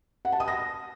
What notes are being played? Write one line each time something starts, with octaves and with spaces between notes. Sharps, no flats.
F#5
A5
D#6
A#6